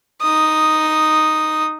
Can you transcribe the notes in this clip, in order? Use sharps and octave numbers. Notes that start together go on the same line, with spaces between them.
D#4 D#6